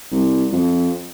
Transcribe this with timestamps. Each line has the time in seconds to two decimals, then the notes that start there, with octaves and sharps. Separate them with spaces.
0.12 C2
0.52 F2